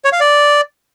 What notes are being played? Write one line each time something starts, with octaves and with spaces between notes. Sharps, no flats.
C#5
F5
D5